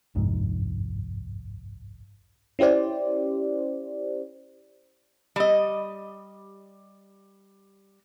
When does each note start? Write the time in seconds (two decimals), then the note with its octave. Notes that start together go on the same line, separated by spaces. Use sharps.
0.15 G1 C2 F2 G#2
2.59 C#4 E4 G4 C5 D5
5.36 G3 D#5